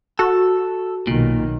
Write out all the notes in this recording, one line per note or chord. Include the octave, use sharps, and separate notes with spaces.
F#4 A4
B1 A#2 D#3